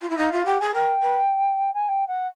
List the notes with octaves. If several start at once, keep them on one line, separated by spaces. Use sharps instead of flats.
F4
E4
D#4 F5
F4 E5
F5
G4 F#5
G#4 G#5
A#4 G5
B4
G#5
G5
F#5